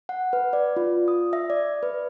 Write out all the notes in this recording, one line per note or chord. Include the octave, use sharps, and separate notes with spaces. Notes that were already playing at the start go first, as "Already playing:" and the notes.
F#5
B4
D5
F4
D#6
E5
D5
B4